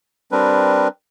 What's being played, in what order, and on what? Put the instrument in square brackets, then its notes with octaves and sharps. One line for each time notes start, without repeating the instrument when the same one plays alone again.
[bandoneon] G3 C4 D4 A#4 B4